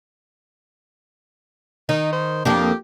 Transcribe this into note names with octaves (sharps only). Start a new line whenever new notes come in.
D#3 D#4
C5
F2 A#3 D4 G4